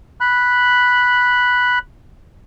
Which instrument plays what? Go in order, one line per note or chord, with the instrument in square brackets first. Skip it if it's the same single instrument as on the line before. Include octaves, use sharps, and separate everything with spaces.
[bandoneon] B5 F#6